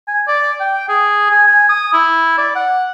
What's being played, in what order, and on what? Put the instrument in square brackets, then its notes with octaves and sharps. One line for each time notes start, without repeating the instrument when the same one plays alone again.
[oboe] G#5
D5
G5
G#4
G#5
G#5
D#6
E4
D5
F#5